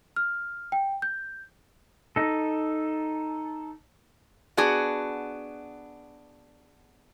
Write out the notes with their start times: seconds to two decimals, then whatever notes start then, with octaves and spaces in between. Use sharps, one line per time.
0.16 F6
0.72 G5
1.02 G6
2.16 D#4 A4
4.57 B3 D4 F#4 G#4